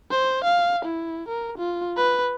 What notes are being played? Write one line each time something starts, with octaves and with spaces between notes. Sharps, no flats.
C5
F5
E4
A#4
F4
B4